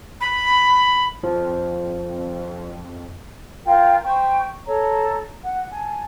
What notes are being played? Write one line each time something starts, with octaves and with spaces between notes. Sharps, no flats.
B5
F2 F3
F4 A#4 G5
C5 G5 C#6
A4 C#5 A#5
F#5
G#5 A5